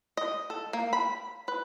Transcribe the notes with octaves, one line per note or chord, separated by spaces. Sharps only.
D#5
A4
A#3
B5
B4